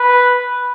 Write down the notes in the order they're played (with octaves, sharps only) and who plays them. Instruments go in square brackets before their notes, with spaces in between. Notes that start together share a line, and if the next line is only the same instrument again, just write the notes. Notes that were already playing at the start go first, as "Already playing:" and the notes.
Already playing: [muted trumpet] B4